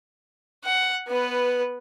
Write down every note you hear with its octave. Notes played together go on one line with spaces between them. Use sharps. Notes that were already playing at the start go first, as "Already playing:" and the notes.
F#5
B3 B4